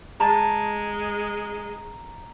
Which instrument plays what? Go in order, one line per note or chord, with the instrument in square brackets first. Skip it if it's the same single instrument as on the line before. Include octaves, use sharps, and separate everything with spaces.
[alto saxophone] G#3 [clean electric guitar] A5 [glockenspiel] A#5